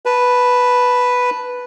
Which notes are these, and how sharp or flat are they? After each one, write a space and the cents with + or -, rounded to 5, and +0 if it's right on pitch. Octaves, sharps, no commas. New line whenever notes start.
B4 +0 A5 +0